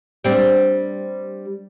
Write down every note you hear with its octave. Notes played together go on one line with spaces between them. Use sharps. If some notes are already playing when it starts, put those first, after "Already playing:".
G3 C4 D4